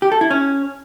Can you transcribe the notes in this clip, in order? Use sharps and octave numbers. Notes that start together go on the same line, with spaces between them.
G4
A4
E4
C#4